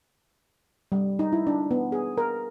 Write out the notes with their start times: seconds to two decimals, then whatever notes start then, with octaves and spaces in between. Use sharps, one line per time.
0.92 G3
1.19 D#4
1.32 E4
1.47 D4
1.71 B3
1.92 G#4
2.18 A#4